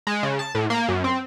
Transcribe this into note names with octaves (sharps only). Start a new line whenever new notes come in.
G#3
C#3
A5
A2
A#3
F#2
C4